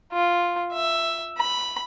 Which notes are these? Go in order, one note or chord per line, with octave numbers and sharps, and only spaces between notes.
F4
E5
B5